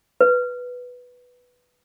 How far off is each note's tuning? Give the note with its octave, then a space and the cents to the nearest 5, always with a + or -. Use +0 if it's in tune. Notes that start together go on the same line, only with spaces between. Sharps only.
B4 +0